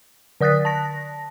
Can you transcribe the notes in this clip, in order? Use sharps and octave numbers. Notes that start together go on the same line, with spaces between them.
D3 D5 D#6 F#6 A6 B6
A5 A#6